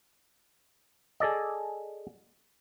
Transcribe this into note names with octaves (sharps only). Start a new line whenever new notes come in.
G#4 A4 D5 D#5